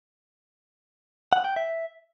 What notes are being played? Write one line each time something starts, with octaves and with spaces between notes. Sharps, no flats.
F#5
G5
E5